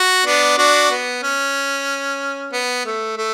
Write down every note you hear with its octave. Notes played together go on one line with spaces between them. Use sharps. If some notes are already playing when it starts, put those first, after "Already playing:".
Already playing: F#4
B3 D4
D4 F#4
B3
C#4
B3
A3
A3